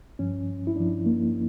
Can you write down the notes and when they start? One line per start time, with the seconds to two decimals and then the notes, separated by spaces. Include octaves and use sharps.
0.19 G2 F3 C#4
0.67 E4
0.76 G2 F3 D4
1.06 A#3